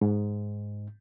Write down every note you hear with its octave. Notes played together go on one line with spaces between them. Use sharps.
G#2